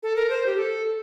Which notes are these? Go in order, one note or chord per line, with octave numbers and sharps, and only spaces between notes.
A4
A#4
C5
G4
A4